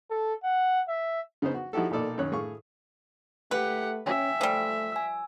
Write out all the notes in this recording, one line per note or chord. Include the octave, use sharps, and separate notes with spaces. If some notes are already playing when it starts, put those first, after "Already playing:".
A4
F#5
E5
C#3 B3 D#4 C5
F#4
F3 D#4 E4 F#4 G4 A4
B1 A#2 A#3 D#4 A4 D5
F#2 D#3 C#5 F#6
A2 G#4 F5 C#6
A3 G4 B4 F#5
C#4 E5 G5 G#5
F3 G3 A3
G#5 E6